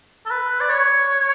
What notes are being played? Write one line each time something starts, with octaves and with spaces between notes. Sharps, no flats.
A4
B4
D5
C#5